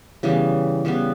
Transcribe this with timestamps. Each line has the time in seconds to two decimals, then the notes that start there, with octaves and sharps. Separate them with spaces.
0.23 C#3 E3 G3 B3
0.85 C#3 E3 G3 B3